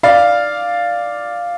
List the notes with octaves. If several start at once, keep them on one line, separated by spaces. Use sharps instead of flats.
D5 F5